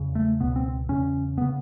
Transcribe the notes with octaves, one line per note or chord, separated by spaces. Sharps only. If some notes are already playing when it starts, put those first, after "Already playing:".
Already playing: E2 C#3
A3
C#2 B2 B3
C4
E2 C#3 C#4
C#3 B3